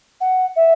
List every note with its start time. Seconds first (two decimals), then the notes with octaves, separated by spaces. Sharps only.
0.21 F#5
0.56 E5